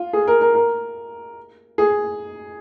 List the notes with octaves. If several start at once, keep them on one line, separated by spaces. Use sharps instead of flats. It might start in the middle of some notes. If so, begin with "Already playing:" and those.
Already playing: F4
G#4
A#4
A#4
A#4
G#4